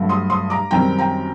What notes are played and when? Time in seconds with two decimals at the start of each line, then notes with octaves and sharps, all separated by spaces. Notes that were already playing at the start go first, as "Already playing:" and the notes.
Already playing: G2 F#3 A3
0.09 C6 D#6
0.30 C6 D#6
0.50 A#5 D6
0.71 F#2 D#3 G3 C4 G5 A#5
0.98 G5 A#5